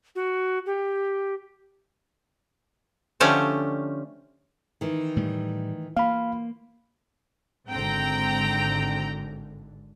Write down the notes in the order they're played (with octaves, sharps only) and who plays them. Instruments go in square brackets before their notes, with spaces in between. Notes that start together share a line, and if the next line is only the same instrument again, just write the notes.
[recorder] F#4
G4
[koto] D3 F3 A3 C#4 G4 A4
[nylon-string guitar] D#3 E3
[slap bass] A2 G3
[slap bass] A#3 [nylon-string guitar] F4 [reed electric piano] F5 B5
[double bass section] G#1 G#2 D3 [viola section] C4 G5 A#5